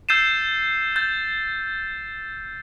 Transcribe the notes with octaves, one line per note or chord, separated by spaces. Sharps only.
E6 G6 A6 C7 D#7 E7
G6 A6